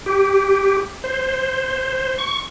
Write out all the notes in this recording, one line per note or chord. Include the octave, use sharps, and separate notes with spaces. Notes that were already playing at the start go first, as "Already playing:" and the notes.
G4
C5
C#6